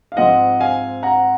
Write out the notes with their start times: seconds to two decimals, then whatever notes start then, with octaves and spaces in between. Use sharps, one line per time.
0.12 F5
0.17 G#2 F3 C4 D#5 F#5
0.60 F5 G#5
1.03 F#5 A#5